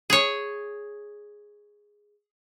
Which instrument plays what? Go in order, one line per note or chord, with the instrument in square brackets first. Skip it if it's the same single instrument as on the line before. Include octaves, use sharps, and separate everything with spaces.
[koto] G#4 C#5